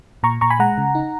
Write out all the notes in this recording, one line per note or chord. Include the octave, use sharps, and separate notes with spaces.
A#2 A#5 C#6
A#2 A#5 C#6
G#5 B5
G#3 F#5 A#5
C#3
D#4